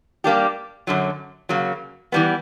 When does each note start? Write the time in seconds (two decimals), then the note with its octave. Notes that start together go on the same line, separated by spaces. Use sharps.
0.24 G3 A#3 D4 G4
0.87 F#2 D3 F#3
1.49 C#3 F#3 A#3
2.12 E3 G3 B3